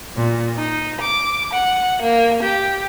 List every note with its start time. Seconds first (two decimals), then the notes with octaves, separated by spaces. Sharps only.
0.16 A#2
0.58 D#4
1.01 D6
1.53 F#5
2.03 A#3
2.42 G4